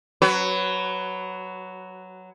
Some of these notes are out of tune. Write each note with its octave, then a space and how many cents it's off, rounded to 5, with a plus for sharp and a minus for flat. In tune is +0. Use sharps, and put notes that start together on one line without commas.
F#3 +5 F#4 +30 B4 +10